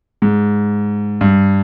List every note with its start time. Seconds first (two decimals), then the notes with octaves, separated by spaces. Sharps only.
0.22 G#2
1.21 G2